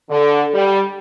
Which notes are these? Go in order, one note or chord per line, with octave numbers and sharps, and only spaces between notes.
D3
G3